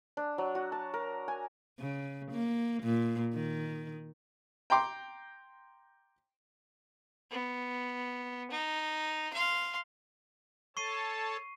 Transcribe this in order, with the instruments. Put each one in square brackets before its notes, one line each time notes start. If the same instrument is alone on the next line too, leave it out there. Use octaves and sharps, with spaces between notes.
[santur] D4
F#3
F#4
A5
A#4
G#5
[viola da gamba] C#3
A#3
A#2
D#3
[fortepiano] G5 A#5 C6 D6
[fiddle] B3
D#4
F5 C6
[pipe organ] A4 C#5 A5 [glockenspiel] C#6 C7 D#7